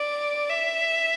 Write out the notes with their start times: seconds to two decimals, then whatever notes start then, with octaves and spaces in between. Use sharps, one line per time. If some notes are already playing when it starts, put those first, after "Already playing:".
Already playing: D5
0.50 E5